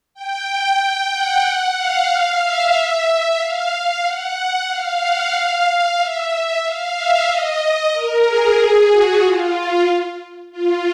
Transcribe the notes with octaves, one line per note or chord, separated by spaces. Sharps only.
G5
G5
F#5
F#5
F5
F5
E5
F5
F5
F#5
F5
F#5
F5
E5
E5
F5
E5
D#5
D#5
A#4
G#4
F#4
F4
F4